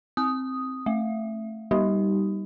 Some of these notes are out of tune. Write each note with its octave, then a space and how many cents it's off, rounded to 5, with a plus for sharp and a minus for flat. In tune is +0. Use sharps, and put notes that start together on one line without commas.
C4 +0 D#6 +0
A3 +0 E5 +15
G3 +0 D#4 +5 G4 -25